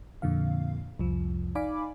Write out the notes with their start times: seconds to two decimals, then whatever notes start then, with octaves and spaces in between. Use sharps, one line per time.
0.22 F2 A#2 D3 F5
0.99 C2 F2 F3
1.55 D#4 D5 F5 G#5 B5 D6